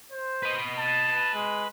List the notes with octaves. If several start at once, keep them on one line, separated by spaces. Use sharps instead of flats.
C5
B4 D#5
A5
G#3